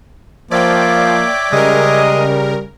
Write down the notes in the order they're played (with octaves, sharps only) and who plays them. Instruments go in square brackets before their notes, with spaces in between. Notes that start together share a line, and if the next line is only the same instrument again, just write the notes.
[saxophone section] F3 [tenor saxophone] A#3 [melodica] C#5 E5 D6 [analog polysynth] D5 G5
[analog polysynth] C#3 A#4 [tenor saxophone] G3 [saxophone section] G#3 D#5